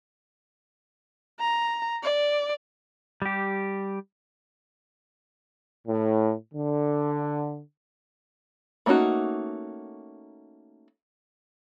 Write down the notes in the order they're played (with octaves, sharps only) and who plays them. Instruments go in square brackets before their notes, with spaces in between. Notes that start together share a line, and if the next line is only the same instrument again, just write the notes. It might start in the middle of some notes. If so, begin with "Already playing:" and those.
[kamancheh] A#5
D5
[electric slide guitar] G3 G4
[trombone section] A2
D3
[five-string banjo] A3 A#3 C#4 D#4 F#4